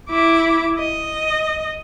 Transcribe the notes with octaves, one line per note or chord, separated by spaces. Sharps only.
E4 D6
D#5